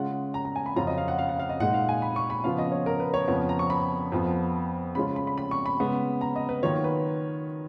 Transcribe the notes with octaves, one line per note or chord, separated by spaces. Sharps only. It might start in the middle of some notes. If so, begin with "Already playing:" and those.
Already playing: C#3 G#3 C#4 F4 F#5
A#5
A#5
G#5
B5
F2 C#3 F#3 C#4 F4 A#5
D#5
F5
F#5
F5
F#5
F5
D#5
A#2 G#3 D#4 F#5
F5
G#5
B5
C#6
B5
C#3 F3 B3 F4 F5
D#5
C#5
A#4
B4
C#5
F2 C#3 F3 B3 C#5
A#5
C#6
B5
F2 F3 B3 F4
C#3 G#3 C#4 F4 B5
B5
B5
B5
C#6
B5
C#3 G#3 B3
A#5
D#5
B4
D#3 F#3 A#3 F4 C#5
B4